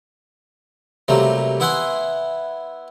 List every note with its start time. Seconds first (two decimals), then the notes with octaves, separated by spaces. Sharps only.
1.08 C3 F#3 G3 A3 A#3
1.60 B3 E4 E5 F#5 G#5 C6